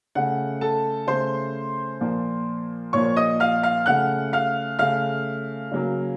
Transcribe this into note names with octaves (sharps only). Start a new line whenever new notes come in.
C#3 A3 F#5
A4 A5
C#3 A3 C5 C6
A#2 F3 A#3
A#2 F3 A#3 C#5 C#6
D#5 D#6
F5 F6
F5 F6
C#3 A3 F#5 F#6
F5 F6
C#3 A3 F5 F6
C#3 F#3 A#3